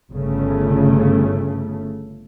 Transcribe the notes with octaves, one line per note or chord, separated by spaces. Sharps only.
G1 C#3 A3